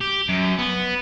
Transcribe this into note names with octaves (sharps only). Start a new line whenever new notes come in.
G4
F#2
B3